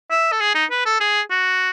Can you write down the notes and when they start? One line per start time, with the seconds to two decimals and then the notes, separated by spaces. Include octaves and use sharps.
0.11 E5
0.32 A4
0.40 G#4
0.55 D#4
0.71 B4
0.86 A4
1.00 G#4
1.30 F#4